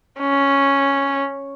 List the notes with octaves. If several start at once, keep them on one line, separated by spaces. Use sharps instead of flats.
C#4